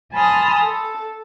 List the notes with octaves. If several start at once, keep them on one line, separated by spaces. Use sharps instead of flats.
G#5 A5 B5 C6 D#6 F6
A4